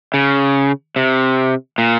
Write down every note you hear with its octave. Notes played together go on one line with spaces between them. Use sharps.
C#3
C3
A#2